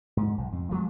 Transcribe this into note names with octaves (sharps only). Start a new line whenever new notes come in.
G#2
B1
F2
F3 G#3 A3